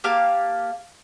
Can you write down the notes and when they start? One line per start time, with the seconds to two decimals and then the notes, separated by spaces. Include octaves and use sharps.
0.04 A#3 G4 F5 A5